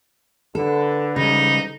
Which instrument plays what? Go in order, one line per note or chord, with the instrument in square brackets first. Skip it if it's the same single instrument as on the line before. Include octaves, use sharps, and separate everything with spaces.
[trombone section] D3 B4 [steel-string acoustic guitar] A4
[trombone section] G#2 E3 G3 [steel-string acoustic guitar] C#3 [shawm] D#4